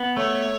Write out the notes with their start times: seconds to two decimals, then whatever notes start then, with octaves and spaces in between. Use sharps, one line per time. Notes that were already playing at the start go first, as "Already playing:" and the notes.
Already playing: B3
0.17 A3 C#5